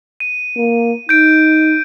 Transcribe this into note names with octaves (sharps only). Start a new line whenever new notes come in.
D#7
A#3
D#4 G6 D7